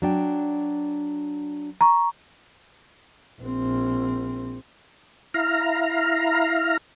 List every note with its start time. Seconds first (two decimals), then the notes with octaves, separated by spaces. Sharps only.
0.02 F#3 D4 G5
1.81 A#5 C#6
3.41 A#1 C4
5.34 E4 F5 A#5